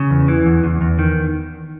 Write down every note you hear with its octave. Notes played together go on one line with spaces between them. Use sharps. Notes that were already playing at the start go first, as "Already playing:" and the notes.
Already playing: C#3
E2
E3
E2
E2
E2
D#3